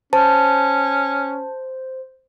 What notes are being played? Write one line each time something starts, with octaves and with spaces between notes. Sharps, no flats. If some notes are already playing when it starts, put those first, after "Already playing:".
C#4 C5 A5